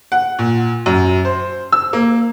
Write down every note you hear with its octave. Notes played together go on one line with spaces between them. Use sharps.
F#5
A#2
F#2
C5
E6
A#3